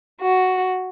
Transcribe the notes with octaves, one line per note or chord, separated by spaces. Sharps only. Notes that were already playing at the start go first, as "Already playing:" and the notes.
F#4